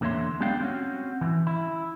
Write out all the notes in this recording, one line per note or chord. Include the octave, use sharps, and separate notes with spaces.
E2 D3 A#3 C#5 E5 C6
G3 G#3 B3 D4 F5 G5
C4 C#4 F#4
E3
E4